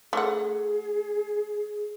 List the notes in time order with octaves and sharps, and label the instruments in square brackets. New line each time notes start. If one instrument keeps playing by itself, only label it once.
[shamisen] A3 F#5 [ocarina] G#4